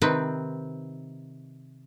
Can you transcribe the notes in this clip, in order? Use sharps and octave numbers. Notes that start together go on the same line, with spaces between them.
C3 D#3 C4 B4